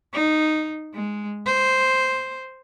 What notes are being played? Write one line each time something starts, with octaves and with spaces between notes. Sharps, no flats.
D#4
G#3
C5